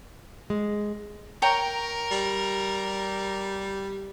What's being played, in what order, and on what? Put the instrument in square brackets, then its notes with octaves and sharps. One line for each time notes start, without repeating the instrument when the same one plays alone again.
[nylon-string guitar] G#3
[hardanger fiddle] A#4 [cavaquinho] C#5 G5 A#5
[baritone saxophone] G3